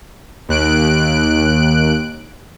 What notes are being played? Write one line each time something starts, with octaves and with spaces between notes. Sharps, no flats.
D#2 F#6 D7